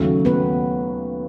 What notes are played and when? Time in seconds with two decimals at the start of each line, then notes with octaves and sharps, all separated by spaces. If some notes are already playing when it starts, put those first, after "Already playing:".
Already playing: D#2 C#3 F#3 A3
0.25 B3 B4